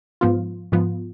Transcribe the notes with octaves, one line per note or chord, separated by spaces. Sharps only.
G#2 F3 B3 F4
G#2 F3 B3 F4